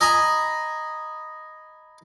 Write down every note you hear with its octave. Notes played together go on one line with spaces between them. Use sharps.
D#5 G#5 A#5 B5 D#6